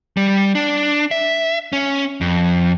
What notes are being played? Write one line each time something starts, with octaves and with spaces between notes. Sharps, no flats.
G3
D4
E5
C#4
F2